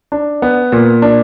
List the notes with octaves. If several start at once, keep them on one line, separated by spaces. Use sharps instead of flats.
D4
B3
A#2
D4